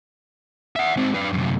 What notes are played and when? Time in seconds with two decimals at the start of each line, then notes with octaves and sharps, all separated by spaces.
0.76 E5 F#5
0.97 G#2 C4
1.14 D4 B4
1.33 F#2 C3